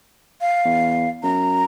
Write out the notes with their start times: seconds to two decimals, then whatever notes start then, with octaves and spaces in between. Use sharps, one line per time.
0.41 F5
0.65 E2
1.23 F#2 A#5